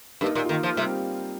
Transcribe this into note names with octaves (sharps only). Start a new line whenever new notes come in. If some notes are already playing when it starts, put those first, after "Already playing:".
G2 A#3 D#4
A#2
F4
D#3 A#3 D#4
F3
C3 G3 C4